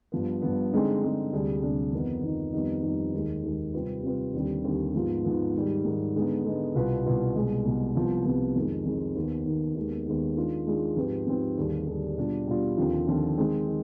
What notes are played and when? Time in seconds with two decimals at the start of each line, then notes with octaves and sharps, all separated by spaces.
0.12 G2 F3 B3
0.42 G2 F3 B3
0.72 D3 G#3 C4 D#4
1.02 D3 G#3 C4 D#4
1.33 D2 C3 G3 D4 G#4
1.62 D2 C3 G3 D4 G#4
1.93 F2 D#3 B3 D#4
2.23 F2 D#3 B3 D#4
2.53 F2 D#3 G3 B3 D#4
2.83 F2 D#3 G3 B3 D#4
3.14 D#2 D#3 G#3
3.43 D#2 D#3 G#3
3.73 C3 G3 C4 F4 B4
4.03 C3 G3 C4 F4 B4
4.33 D#2 D3 G3 C4
4.64 D#2 D3 G3 C4
4.94 G#2 F3 B3 F4
5.24 G#2 F3 B3 F4
5.54 G#2 D#3 G3
5.85 G#2 D#3 G3
6.15 D3 G#3 B3 D#4
6.45 D3 G#3 B3 D#4
6.75 C2 B2 B3 F4 B4
7.05 C2 B2 B3 F4 B4
7.35 C2 B2 G#3
7.65 C2 B2 G#3
7.95 C2 C3 F3 B3
8.25 C2 C3 F3 B3
8.56 F2 D#3 G#3
8.86 F2 D#3 G#3
9.15 D#2 D#3 B3
9.46 D#2 D#3 B3
9.76 D#2 D#3 G#3 B3
10.06 D#2 D#3 G#3 B3
10.37 D#3 G#3 D4 F4 G#4
10.66 D#3 G#3 D4 F4 G#4
10.96 G#2 F3 C4 G4 B4
11.27 G#2 F3 C4 G4 B4
11.57 D#2 D3 G3 D4 G#4
11.87 D#2 D3 G3 D4 G#4
12.17 B2 G3 D4 F4
12.47 B2 G3 D4 F4
12.77 D#2 D3 F3 C4 F4
13.07 D#2 D3 F3 C4 F4
13.38 D#3 G#3 C4
13.67 D#3